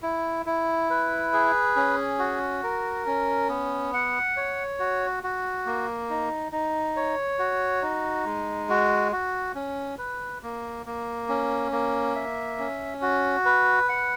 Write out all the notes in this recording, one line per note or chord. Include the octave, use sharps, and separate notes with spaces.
E4
E4
B4
G#4
C#4
F#4
A#4
C#4
B3
F#5
C#5
F#4
F#4
A#3
D#4
D#4
C#5
F#4
D#4
G#3
F#4
F#4
C#4
B4
A#3
A#3
C#4
A#3
E5
C#4
F#4
B4
F#5